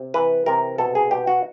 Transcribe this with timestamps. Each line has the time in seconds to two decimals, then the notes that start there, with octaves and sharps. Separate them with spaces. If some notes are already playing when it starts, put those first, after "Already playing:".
Already playing: C3
0.14 E3 B4
0.46 C3 A#4
0.78 B2 A4
0.95 G#4
1.11 B2 G4
1.27 F#4